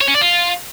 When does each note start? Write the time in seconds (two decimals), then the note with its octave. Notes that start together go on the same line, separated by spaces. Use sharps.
0.01 C#5
0.08 C#4
0.14 D5
0.21 F4